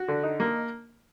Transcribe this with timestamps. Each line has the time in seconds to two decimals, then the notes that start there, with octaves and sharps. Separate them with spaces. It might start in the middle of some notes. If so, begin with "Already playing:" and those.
Already playing: F#4
0.08 D3
0.23 D#4
0.40 A#3